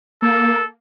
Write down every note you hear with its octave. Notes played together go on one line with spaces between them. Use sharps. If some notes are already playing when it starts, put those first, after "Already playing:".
A#3 A4